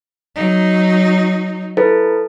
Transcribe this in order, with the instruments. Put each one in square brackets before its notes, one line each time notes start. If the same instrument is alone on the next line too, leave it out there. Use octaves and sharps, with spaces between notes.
[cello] F#3 D#4
[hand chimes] E4 A4 B4